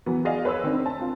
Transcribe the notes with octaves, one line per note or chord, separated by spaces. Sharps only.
E3 F#3 B3
F#4 G#4 D5 D#5 F5 G#5
B4 C#5 B5 E6
D#3 C4 D4
A5
C4 F4